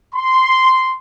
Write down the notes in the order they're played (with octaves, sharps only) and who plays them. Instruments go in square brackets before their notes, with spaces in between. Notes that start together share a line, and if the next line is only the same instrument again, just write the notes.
[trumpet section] C6